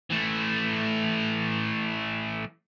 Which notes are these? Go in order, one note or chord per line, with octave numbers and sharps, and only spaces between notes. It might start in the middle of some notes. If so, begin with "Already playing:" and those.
E3 A3